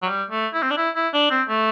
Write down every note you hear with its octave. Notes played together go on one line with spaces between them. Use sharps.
F#3
G3
A3
E4
C4
D4
E4
E4
D4
C4
A3